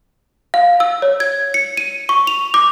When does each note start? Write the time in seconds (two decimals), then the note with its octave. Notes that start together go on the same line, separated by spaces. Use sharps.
0.54 F5
0.80 E6
1.02 C#5
1.20 G#6
1.54 C#7
1.77 D#7
2.09 C#6
2.27 F7
2.54 D6